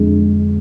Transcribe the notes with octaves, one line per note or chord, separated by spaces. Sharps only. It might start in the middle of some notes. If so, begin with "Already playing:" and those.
Already playing: F2 D3 G#3